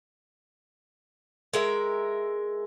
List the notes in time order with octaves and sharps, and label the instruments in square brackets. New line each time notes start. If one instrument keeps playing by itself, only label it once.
[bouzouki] G#3 A#4 E5